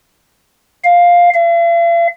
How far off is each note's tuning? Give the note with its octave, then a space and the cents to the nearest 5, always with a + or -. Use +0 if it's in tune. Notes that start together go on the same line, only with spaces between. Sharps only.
F5 +5
F5 -45